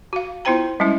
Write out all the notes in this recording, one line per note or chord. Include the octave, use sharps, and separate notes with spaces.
F#4 F5
B3 E4 F4 C5 G5 A#5
G3 G#3 C#4 E4